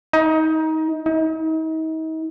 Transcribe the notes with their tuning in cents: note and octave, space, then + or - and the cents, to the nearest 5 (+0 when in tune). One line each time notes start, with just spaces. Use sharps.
D#4 +25
D#4 +40